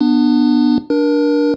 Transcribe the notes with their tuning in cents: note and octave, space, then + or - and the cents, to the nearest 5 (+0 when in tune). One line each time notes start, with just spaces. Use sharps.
B3 -10 D4 +25
D4 +0 A#4 +30